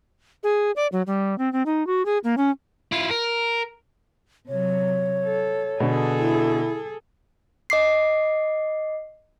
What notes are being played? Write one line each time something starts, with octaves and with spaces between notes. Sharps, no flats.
G#4
D5
F#3
G3
C4
C4
D#4
F#4
G#4
A#3
C#4
E4 F4
A#4
C3 F#3 C#5
A4
B2 D3 G#4 A4
E4
D#5 D6 C7